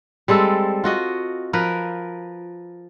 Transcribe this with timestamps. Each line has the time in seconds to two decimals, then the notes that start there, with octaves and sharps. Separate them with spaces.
0.28 G3 G#3 C4 A4
0.84 F4 F#4 D#5
1.53 F3 A#4 B4